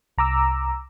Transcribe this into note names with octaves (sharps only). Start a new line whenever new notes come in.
C2 A#5 D6 E6